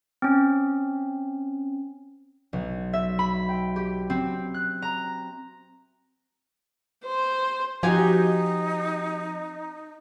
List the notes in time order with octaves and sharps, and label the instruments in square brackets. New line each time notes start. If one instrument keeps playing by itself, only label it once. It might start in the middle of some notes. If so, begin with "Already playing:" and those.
[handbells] C4 C#4
[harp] B1
E5
B5
G5
G4
C4
F#6
A#5
[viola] C5
[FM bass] F3 [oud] C4 F#4 F5 [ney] D#4 [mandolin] G4 G5 G#5